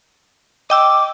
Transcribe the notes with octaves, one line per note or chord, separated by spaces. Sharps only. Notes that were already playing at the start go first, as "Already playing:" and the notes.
D#5 G5 D6 E6